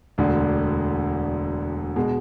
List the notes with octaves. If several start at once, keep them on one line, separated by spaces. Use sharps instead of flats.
E1 D2 D3
B2 G#3